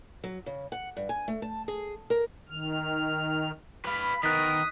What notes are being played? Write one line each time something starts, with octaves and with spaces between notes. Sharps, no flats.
F#3
C#3
F#5
G2
G#5
A3
A5
G#4
A#4
D#3 F6
B4 F5 B5
D#3 B3 A#4 D#6 F#6 B6